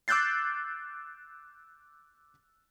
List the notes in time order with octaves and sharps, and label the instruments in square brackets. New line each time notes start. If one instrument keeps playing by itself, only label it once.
[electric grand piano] D6 E6 F#6 G6 A6 C7